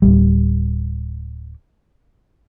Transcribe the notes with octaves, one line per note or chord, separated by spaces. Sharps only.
D1 A#1 G3